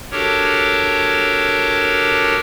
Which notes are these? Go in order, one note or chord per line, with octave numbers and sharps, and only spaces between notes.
D4 F#4 G4 A4 A#4 C#5